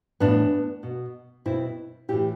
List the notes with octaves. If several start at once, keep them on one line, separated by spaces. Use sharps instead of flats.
A2 E3 B3 D4
B2
B2 C4 E4
A2 E3 E4 G4